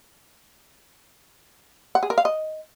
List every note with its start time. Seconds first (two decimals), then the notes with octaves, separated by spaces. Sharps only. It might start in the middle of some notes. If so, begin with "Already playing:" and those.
1.95 F#5
2.03 G#4
2.10 A#4
2.18 F5
2.25 D#5